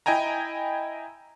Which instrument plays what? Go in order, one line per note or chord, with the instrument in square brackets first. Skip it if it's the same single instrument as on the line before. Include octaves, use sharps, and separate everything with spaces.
[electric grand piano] E4 D#5 G5 G#5 A#5